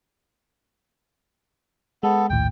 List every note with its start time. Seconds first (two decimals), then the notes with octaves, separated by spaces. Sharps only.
2.03 G#3 B3 A4
2.30 A#1 D#2 A2 G5